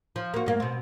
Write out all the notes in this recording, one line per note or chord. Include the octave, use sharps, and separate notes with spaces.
F3
A#3 F#4
G2 A#3
B2 C4